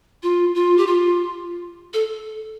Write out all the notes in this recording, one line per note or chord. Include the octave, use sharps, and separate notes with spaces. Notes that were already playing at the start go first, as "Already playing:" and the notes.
F4
F4
G4
F4
A4